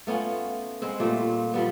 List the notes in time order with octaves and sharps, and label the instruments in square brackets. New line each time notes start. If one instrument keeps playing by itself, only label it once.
[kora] A3 B3 C#4 F4
G#3 B3 C4
A#2 G3 A3
F3 G3 B3